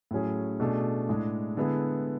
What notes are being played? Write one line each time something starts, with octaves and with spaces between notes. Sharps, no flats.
A2 F#3 C#4 G#4
B2 A3 D4 G#4
A2 G#3 D4 G#4
D3 G#3 B3 E4 G#4